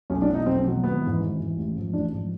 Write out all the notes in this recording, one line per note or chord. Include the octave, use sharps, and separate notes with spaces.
B1 C#4
D4
B2 F#3
D#4
B1 C4
B2 F#3
G#1 B3
G#2 E3
G#1
G#2 E3
A1
G#2 F3
A1 D4
G#2 F3